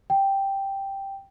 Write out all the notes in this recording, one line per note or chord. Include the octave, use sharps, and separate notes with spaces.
G5